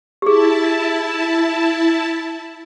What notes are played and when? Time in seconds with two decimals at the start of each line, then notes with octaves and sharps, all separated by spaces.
0.22 E4 G4 G#4 A5